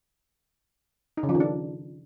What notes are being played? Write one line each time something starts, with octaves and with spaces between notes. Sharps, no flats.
D#4
C#3
F3
D#3
D4